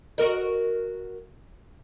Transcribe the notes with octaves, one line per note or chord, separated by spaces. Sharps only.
F#4 A#4 D#5